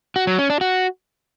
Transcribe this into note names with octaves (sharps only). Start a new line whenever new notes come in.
F#4
F#3
C#4
D4
F#4